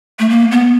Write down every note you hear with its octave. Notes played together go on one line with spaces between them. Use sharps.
A3
A#3
B3